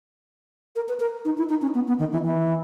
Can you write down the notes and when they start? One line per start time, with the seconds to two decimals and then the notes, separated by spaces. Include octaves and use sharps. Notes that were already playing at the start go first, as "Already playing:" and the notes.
0.76 A#4
0.88 B4
1.00 A#4
1.25 D#4
1.37 E4
1.49 D#4
1.62 C#4
1.74 B3
1.88 B3
1.99 D#3
2.12 E3
2.24 E3